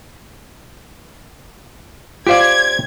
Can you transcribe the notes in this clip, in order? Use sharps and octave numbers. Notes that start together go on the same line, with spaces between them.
F4 G4 C5 D5 F5 G#6